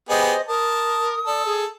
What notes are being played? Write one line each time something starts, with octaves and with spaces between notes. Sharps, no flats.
B3 G4 G#4 C5 D#5
A#4 A5 D#6
A4 D5
G#4